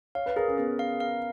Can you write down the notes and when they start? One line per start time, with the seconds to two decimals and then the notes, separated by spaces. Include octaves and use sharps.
0.15 C#5 F5
0.26 B4
0.36 G#4 A#4
0.48 C#4
0.58 B3 G#4
0.79 F5
1.00 F5